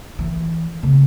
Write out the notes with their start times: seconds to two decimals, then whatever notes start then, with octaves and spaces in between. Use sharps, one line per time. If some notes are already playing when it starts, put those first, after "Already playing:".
0.19 E3
0.83 C#3